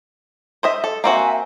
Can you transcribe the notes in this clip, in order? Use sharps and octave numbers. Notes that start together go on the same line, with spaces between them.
C5 D#5 E5
A4
A#3 C4 F#4 E5 G#5